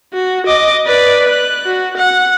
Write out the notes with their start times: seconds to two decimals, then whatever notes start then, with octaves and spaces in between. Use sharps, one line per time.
0.14 F#4
0.46 D#5 D6
0.86 B4 D5
1.29 F#6
1.66 F#4
1.97 F#5